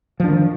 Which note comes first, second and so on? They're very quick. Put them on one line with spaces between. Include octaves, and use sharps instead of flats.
F3 D4 D#3